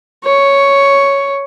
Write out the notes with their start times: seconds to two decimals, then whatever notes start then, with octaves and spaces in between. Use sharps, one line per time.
0.24 C#5